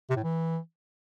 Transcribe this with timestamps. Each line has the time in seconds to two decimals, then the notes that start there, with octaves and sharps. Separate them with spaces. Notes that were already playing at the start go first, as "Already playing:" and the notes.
0.10 C3
0.16 A2
0.23 E3